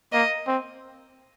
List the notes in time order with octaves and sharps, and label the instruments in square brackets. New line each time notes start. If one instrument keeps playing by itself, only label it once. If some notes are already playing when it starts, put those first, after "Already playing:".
[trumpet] A#3 [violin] D#5
[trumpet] C4